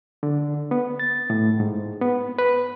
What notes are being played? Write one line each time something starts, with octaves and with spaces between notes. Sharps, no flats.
D3
B3
A6
A2
G#2
B3
B4